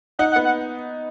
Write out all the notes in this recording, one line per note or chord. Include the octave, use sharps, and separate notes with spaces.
D#4 F#5
F#5
B3
F#5